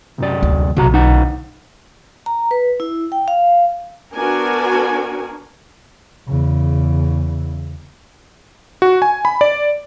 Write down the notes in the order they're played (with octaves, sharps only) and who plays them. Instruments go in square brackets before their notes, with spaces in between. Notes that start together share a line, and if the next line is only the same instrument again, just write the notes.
[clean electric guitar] C2 F#2 D5
[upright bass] D2
[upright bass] B1 [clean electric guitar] C3 F#4 A#5
[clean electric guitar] D2 D#4 F#5
[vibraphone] A#5
B4
E4
G5
F5
[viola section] B3 D4 F#4 A#4 G#5
[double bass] E2 C#3
[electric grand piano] F#4
G#5
B5
D5